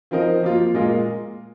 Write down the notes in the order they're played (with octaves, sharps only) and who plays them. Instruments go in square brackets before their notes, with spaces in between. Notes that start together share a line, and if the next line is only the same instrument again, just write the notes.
[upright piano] F3 C4 D#4 A#4 D#5
F3 A#3 F4
A#2 G#3 F4 A#4 D#5